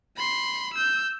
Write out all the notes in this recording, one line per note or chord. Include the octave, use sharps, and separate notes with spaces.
B5 C6
E6 G6